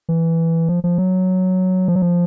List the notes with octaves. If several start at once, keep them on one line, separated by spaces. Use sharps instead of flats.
E3
F3
F3
F#3
F3
F#3
F3